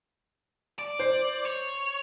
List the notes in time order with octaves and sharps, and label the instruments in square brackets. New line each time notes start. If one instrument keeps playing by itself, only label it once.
[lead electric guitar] D5
[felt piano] C5
[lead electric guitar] C#5